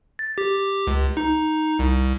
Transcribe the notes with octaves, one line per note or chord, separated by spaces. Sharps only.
A6
G4
C#2
D#4
C2